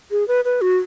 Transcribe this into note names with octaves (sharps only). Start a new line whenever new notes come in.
G#4
B4
B4
F#4